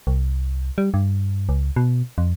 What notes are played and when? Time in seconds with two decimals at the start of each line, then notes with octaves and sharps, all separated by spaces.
0.07 C2
0.78 G3
0.94 G2
1.49 C#2
1.76 B2
2.18 F2